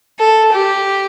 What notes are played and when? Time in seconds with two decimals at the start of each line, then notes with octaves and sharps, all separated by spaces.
0.19 A4
0.53 G4